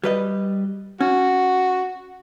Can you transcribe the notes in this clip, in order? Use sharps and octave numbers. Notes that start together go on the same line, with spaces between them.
G3 B4 D#5
C#4 F#4